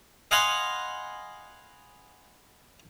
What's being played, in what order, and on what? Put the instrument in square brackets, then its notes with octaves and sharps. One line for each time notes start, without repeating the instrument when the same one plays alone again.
[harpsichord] D#5 F5 F#5 G#5 B5 C6